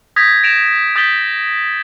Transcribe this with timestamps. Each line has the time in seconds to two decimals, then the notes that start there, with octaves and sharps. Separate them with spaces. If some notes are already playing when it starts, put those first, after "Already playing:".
0.16 D#6 G6 G#6 A#6 B6
0.43 A#6 D7 E7 F7
0.96 D#6 G6 A6 B6 F#7 G7